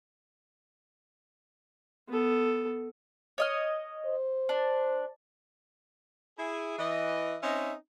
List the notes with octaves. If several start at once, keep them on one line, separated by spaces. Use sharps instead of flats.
B3 A4
C#5 D#5 F6
C5
D4
E4 G#4
E3 D#5
C4 C#4 D#4 D#5 E5